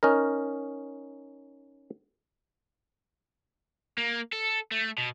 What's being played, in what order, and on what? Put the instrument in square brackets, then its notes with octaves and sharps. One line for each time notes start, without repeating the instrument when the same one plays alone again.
[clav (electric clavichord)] C#4 D#4 A#4
[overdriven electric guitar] A#3
A4
A3
B2